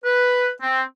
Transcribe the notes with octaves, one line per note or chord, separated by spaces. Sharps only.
B4
C4